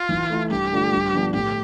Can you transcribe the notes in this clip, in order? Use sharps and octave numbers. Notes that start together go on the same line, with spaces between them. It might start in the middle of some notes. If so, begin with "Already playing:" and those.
Already playing: F4
E3
A3 E4
G2 G4
D3 A3 D4 F4
G2
D3 F3 B3 D4
A2 G4